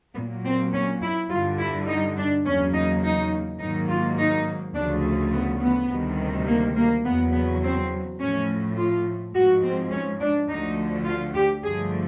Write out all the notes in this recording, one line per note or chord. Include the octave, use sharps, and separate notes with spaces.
A#2 F#3 A#3 B3
C4
C#4
E4
G2 D3 G3 F4
E4
D#4
D4
E2 C#3 F#3 A#3 C#4
D#4
D#4
G#2 D#3 F#3 A#3 D#4
F4
D#4
D2 C#3 F3 A3 D4
B3
B3
D2 C3 D#3 G3
A#3
A#3
E2 C#3 F#3 B3
B3
C4
A2 F3 A3 C#4
F4
G#2 F3 G#3 F#4
C4
C#4
D4
D2 D3 F3 A3 D#4
F4
G4
G2 D3 F3 A3 G#4